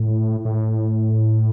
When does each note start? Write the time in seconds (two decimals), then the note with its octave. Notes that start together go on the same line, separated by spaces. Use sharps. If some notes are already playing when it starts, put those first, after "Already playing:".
Already playing: A2
0.45 A2